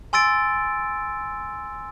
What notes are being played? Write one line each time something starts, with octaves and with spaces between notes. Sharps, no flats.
G#5 C6 E6 A6 D7